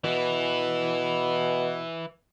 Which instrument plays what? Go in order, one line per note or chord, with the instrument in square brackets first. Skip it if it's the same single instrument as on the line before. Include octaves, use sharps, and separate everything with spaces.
[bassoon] B2 [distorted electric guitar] E3 E4